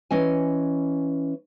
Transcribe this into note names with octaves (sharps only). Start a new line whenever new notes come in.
E3 C#4 D#5 G#5